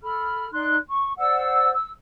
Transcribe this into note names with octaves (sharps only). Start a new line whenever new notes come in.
A4 B5 F6
D#4 D5 C6 F#6
C#6
C5 D5 F#5 E6
E6